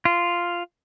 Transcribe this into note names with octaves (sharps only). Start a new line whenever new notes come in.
F4